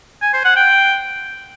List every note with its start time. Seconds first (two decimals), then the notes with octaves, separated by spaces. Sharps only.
0.22 G#5
0.33 C5
0.45 F#5
0.56 G5